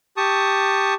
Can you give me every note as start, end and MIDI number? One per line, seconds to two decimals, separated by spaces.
0.17 0.94 67
0.17 0.94 81
0.17 0.94 85
0.17 0.94 87